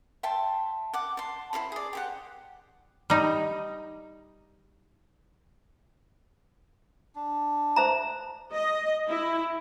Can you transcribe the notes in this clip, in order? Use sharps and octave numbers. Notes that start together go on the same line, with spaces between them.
E5 G5 A5 C6
F#5 D6
A5 C6
E4 A4 C5 B5
G#4 D5
G4 C5 F#5
G3 D#4
D4
C5 E5 A#5
D#5
E4